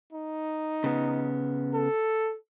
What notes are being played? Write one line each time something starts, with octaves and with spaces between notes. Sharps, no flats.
D#4
C#3 B3
A4